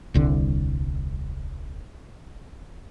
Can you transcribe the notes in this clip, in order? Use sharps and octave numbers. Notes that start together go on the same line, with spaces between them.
D#1 C2 D3